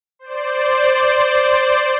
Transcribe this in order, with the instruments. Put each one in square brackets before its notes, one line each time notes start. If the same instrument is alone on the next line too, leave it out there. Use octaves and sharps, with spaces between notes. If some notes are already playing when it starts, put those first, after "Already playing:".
[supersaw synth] C5 D5